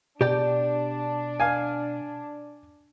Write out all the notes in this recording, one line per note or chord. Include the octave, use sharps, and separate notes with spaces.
B2 D4 G4 D5 G5
F5 G#5